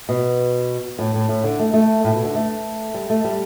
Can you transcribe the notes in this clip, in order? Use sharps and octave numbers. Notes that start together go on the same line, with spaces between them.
B2
A2
A2
A2
D3
A3
A3
A2
B2
D3
A3
G3
A3
G3